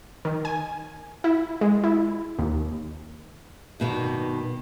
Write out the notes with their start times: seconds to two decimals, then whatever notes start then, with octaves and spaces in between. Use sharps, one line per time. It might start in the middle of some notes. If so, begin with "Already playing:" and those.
0.25 D#3
0.45 G#5
1.24 E4
1.61 G#3
1.84 E4
2.39 D#2
3.80 G2 B2 D#3